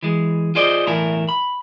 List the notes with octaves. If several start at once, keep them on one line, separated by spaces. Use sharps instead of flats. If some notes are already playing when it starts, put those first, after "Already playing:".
E3 G#3
F4 G#4 C5 D5 D#5
B1 E2 A2 E4 A#4 G#5
B5